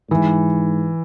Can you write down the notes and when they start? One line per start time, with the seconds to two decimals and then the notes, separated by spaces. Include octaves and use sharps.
0.10 G#2 E3